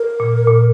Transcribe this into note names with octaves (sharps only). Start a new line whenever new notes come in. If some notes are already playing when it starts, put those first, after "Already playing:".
Already playing: A#4
A#2
A#2